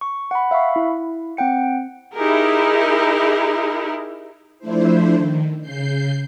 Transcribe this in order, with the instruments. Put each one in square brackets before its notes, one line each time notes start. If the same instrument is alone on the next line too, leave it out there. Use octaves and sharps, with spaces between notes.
[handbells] C#6
F#5 B5
E5 F5 B5 C#6
E4
C4 F#5 G5 C#7
[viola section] D#4 E4 G4 G#4 A#4
[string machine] F3 A3 D4 E4 C5
D#3
C#3 G6 C7